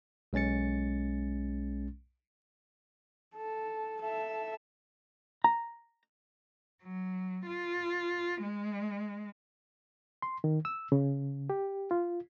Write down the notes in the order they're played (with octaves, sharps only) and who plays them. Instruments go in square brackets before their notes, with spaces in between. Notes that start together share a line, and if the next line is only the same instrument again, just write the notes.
[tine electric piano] B1 G#3 C#4 A6 C#7
[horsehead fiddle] A4
A4 E5
[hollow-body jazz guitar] A#5
[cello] F#3
F4
G#3
[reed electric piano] C6
D#3
E6
C#3
G4
F4